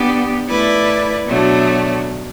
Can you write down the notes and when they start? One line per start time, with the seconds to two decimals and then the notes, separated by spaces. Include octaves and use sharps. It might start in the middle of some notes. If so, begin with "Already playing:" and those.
Already playing: B3 D4 G4
0.49 A3 E4 B4 D5
1.28 B2 F#3 A3 D4